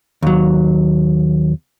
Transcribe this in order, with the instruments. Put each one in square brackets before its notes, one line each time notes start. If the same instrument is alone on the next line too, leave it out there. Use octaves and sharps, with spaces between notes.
[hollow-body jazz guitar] D#2 F#3